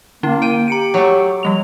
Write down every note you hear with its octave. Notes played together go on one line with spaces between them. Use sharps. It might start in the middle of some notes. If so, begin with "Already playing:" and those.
D3 A#3 C#4 E4
G5 D7 D#7
G4 A#5 C#7 D7
F#3 A3
F3 G3 F7